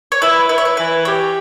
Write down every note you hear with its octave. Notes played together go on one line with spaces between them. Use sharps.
C#5
E4 B4
E4 B4
C#5
B4
E3 B4
G4 C#5